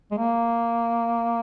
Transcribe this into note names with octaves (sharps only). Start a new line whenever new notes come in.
G#3
A#3